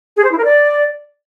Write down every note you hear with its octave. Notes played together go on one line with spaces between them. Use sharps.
G#4
C5
E4
A#4
D5